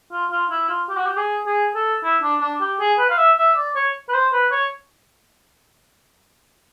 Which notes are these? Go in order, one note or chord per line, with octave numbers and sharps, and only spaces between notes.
F4
F4
E4
F4
G4
F#4
G4
G#4
G#4
A4
E4
D4
D4
G4
G#4
B4
F5
E5
E5
D5
C#5
B4
C5
B4
C#5